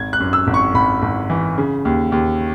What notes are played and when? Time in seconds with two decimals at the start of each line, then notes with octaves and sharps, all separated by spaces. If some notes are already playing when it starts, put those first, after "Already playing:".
Already playing: G#1 G#6
0.13 F#6
0.20 F#2
0.33 E6
0.47 G#1
0.54 C#6
0.74 G#1 B5
1.02 G#1
1.30 E3
1.58 C#3
1.85 D#2
2.12 D#2